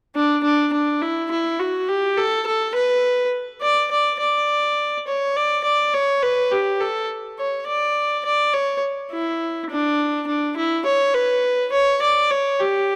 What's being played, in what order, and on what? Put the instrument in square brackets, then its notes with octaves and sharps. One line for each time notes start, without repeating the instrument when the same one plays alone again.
[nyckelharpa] D4
D4
D4
E4
E4
F#4
G4
A4
A4
B4
D5
D5
D5
C#5
D5
D5
C#5
B4
G4
A4
C#5
D5
D5
C#5
E4
D4
D4
E4
C#5
B4
C#5
D5
C#5
G4